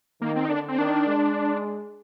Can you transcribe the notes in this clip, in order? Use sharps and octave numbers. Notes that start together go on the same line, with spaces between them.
D#3 A#3
C4
D#4
D3 D4
C4
D#3 D4
G#3